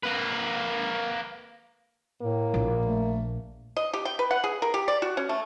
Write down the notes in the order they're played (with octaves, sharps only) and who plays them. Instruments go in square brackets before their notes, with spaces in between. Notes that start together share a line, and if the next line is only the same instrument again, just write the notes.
[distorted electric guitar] A#3 B4
[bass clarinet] A2 [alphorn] A#3
[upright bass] A#1
[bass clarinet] A3
[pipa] D#5
G4
G5
B4
F#5
G#4
A#4
G4
D5
F#4
C#4
A3